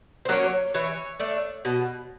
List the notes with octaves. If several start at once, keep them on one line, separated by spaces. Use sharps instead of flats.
C5
F#3 A#3 C#4 C#5
E3 C#5
A3 D4
B2